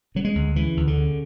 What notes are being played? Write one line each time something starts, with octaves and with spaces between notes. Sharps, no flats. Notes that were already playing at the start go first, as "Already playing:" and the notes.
C#3 F#3
G#3
D2
C#3 E3
D2
D3
C#3